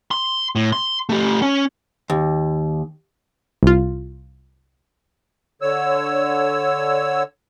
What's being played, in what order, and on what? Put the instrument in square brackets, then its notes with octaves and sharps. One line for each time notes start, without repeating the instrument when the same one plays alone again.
[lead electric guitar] C6
A2
C6
A3 G4
C#4
[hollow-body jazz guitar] D#2
[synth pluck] C2 F4
[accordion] D3 C#5 E6